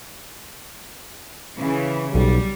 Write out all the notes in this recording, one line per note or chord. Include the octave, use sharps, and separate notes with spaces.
C#3 E3
B1 G3